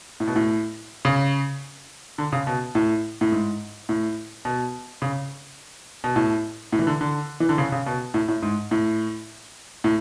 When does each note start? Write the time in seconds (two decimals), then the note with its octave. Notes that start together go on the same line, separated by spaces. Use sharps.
0.20 A2
0.28 B2
0.36 A2
1.05 C#3
2.18 D3
2.32 C#3
2.47 B2
2.75 A2
3.21 A2
3.32 G#2
3.89 A2
4.45 B2
5.02 C#3
6.04 B2
6.16 A2
6.73 A2
6.79 E3
6.87 D3
7.01 D3
7.40 E3
7.49 D3
7.58 C#3
7.72 C#3
7.87 B2
8.14 A2
8.28 A2
8.42 G#2
8.71 A2
9.84 A2